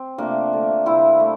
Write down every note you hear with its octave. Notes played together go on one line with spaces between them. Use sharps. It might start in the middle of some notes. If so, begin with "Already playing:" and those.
Already playing: C4
C3 F3 A3 A#3 D4
D3 A3
C3 G3 C4 E4
A3